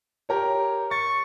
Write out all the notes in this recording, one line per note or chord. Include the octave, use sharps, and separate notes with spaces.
G4 A#4 C#5
C#6 A6